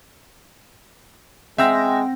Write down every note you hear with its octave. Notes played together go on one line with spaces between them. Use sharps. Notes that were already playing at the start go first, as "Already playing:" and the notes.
G#3 C4 E5 F#5 G5 E6 A#6